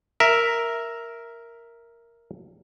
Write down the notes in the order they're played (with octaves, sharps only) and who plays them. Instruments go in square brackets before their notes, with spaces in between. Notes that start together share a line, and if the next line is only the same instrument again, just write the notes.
[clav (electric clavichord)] A#4 E5